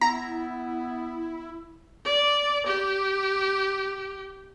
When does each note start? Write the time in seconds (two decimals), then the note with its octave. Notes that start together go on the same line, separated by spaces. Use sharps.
0.01 B3 E4 A#5
2.05 D5
2.67 G4